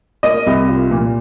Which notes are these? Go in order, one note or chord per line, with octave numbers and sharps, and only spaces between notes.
A#3 D#5
C2
F4
A#2